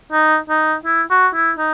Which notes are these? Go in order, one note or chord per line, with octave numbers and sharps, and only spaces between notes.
D#4
D#4
E4
F#4
E4
D#4